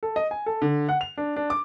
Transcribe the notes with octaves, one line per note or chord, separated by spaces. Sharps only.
A4
D#5
G#5
A4
D3
F#5
F7
D4
D4
D6